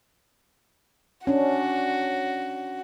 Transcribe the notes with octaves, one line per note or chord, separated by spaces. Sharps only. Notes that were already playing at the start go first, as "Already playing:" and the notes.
C#4 D4 F#4